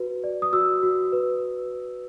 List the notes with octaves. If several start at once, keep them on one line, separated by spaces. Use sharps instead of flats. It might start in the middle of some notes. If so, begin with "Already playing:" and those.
Already playing: F#4 B4
D5
D#6
F#4 E6
F#4
B4